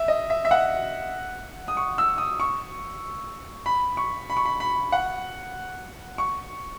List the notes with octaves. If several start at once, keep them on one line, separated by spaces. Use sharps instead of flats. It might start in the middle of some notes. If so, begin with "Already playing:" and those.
Already playing: E5
D#5
E5
E5
F#5
D#6
C#6
E6
D#6
C#6
B5
C#6
B5
C#6
B5
B5
F#5
C#6